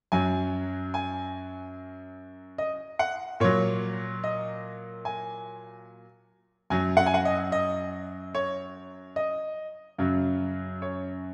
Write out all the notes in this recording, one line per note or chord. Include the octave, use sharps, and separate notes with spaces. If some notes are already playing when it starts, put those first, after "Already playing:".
F#2 F#3 G#5
G#5
D#5
F#5
A#2 F#3 C#5
D#5
G#5
F#2 F#3 G#5
F#5
G#5
F#5
D#5
D#5
C#5
D#5
F#2 C#3 F#3
C#5